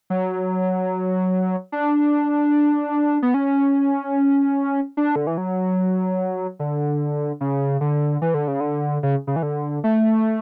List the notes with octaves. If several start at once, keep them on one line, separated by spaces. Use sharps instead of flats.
F#3
D4
B3
C#4
D4
D3
E3
F#3
D3
C#3
D3
E3
D3
C#3
D3
C#3
C#3
E3
D3
A3